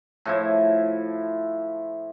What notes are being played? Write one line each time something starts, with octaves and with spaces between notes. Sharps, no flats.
A2 F3 E4